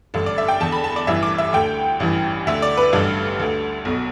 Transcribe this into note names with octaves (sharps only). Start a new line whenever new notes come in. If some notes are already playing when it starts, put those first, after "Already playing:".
A1 G2 D3 A4
D5
E5
G5
E2 D3 A5
B5
A5
D5
A1 G2 E3 E5
D6
E5
D2 D3 G5
A1 G2 E3
D2 D3 E5
D5
B4
A1 G2 D3 A4
D2 D3
B1 B2